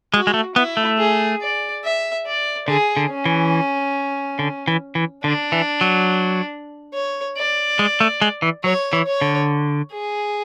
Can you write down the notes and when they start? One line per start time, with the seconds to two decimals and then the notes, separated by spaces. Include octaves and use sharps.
0.14 G#3 F#4
0.27 G#3
0.34 A3
0.55 B3 E4
0.77 A3
0.98 G#4
1.41 D5
1.84 E5
2.26 D5
2.68 D3 G#4
2.97 D3
3.10 C#4
3.25 E3
4.39 D3
4.68 E3
4.95 E3
5.23 D3 D4
5.52 E3
5.81 F#3
6.93 C#5
7.37 D5
7.79 G#3
8.00 A3
8.22 G#3
8.42 E3
8.64 F#3 C#5
8.93 E3
9.07 C#5
9.21 D3
9.92 G#4